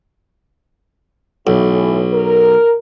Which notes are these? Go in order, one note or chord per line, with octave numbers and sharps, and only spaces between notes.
B1 A2 E3
A#4